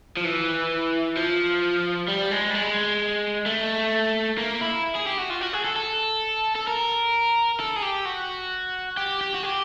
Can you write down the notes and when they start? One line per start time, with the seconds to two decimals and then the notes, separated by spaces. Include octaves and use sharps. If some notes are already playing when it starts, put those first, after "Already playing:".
0.17 F3
0.25 E3
1.17 F3
2.08 G3
2.31 G#3
2.50 G3
2.55 G#3
3.46 A3
4.38 A#3
4.61 E4
4.96 G#4
5.07 G4
5.18 F#4
5.30 F4
5.41 F#4
5.53 G#4
5.64 A4
5.76 A4
6.56 A4
6.68 A#4
7.60 A4
7.76 G#4
7.83 G4
8.06 F#4
8.97 G4
9.21 G4
9.34 F#4
9.43 G4